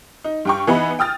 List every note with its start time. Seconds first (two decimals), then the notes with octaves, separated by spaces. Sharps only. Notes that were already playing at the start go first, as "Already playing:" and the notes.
0.24 D#4
0.45 G2 G5 C#6
0.67 E3 B3 D#4 B5
0.99 G5 D#6 F6 A6